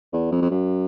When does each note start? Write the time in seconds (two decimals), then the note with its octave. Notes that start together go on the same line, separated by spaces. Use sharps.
0.13 E2
0.31 F2
0.42 F2
0.50 F#2